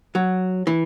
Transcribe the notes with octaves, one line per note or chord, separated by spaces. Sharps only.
F#3
E3